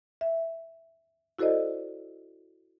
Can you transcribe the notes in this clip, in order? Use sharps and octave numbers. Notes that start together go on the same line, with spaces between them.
E5
E4 F#4 A4 C5 D5 D#5